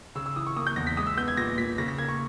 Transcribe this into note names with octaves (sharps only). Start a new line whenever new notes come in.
C#3 E6
E6
E3 D#6
C#6
A#3 D#6
G6
E2 A#6
B6
G#3 D#6
E6
B3 G6
G#6
A#2 A#6
A#2 B6
C#3 A#6
A#6
A#3 G#6
C#6